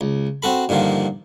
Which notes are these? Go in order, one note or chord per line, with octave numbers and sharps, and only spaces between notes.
C#2
C4 F#4 A4 B5
G2 A#2 D3 D#3 F3